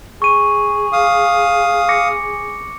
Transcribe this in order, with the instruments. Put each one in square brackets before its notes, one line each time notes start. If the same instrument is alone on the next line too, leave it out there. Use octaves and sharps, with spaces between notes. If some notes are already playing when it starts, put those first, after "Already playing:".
[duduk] G#4 [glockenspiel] C#6 D#7
[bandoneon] F5 D#6
[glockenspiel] D6 A#6 C#7